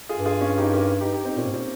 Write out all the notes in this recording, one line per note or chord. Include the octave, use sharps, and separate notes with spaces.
F4 G#4
G2
F4 G#4
C#4 F4
D#4 G4
G4 A#4
D#4 G4
D#4 G4
C4 D#4
A#2 A#3 C#4
G#2
A#2 C4